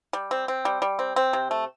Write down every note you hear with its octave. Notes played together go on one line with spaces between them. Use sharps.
G3
C4
C4
G3
G3
C4
C4
C3
A3